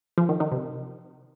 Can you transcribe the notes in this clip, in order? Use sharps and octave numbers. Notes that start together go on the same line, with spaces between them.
F3
D#3
D#3
C3